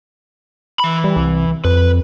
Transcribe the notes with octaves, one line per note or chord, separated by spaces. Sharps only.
E3 B5
G3
C2
F2 B4